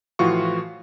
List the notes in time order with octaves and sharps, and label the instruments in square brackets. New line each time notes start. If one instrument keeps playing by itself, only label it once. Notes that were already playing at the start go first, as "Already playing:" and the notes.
[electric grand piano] A2 E3 F3 F4 F#4 C#6